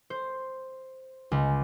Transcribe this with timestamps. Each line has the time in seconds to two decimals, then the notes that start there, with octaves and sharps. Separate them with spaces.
0.10 C5
1.31 C#2